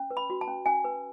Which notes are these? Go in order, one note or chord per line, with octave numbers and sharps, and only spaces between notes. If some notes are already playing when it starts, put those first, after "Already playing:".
Already playing: C#4
B4
B5
F#4
A5
C#4
C#4 G#5
B4